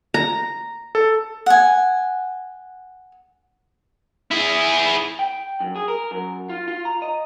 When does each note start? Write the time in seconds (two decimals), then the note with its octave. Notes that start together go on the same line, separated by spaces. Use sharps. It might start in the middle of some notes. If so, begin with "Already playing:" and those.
0.14 A#5
0.95 A4
1.46 F#5 G#5
4.31 E4 G#4
5.19 G5
5.60 F#2
5.76 G#4
5.88 A#4
6.11 F#2
6.49 F4
6.68 F4
6.85 A#5
7.02 D#5